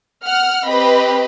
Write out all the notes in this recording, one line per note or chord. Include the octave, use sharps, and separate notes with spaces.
F#5 F6
C4 G4 B4 D#5 B5